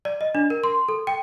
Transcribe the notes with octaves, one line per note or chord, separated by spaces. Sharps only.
D5
D#5
D4
A#4
C6
A4
G5